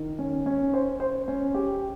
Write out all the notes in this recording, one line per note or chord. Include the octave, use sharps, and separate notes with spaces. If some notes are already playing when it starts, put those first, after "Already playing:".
Already playing: D#3
C#4
C#4
C5
C5
C#4
G4